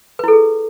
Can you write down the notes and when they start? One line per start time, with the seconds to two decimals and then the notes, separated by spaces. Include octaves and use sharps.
0.19 B4
0.24 E4
0.28 A4
0.32 G#4